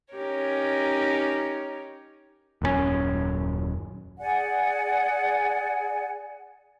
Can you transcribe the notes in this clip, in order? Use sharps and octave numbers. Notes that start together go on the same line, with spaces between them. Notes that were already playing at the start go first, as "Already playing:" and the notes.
C#4 D#4 G4 A#4 C#5
D#1 F#2 G3 C#4
G#4 D5 F#5 G#5